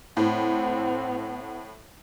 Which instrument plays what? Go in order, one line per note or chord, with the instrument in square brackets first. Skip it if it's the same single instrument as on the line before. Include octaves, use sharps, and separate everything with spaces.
[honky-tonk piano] A2 [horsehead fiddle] C4 F#5